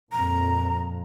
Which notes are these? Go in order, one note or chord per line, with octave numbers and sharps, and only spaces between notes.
F2 A#2 A#5